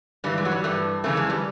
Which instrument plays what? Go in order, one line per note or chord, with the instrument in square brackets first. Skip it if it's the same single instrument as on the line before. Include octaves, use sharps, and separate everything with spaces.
[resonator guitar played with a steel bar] G2 E3 G3
G#3
F#3
G3
G2 E3 A3
F2 C#3 E3 A3
G#3
G3